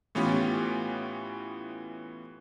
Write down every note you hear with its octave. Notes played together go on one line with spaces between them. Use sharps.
A2 E3 B3 C#4 F4 G4